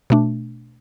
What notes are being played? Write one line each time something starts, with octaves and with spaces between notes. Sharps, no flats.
B2 A3 D4